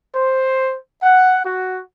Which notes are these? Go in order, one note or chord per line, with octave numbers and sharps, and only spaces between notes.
C5
F#5
F#4